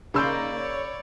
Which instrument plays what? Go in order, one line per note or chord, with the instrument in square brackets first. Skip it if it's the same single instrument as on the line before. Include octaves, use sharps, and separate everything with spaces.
[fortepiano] C#3 C6 [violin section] A#3 D#4 [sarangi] D5 [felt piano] B5 E6 G6
[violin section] C#5